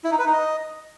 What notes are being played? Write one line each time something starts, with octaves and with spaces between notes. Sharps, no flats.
E4
D#4
B4
D#4
D#5